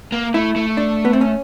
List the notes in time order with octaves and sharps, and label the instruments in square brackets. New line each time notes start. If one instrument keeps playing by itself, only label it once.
[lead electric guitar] A#3
[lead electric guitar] A3 [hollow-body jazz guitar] E4
[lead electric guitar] A3
[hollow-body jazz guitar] D4
B3
C4
C#4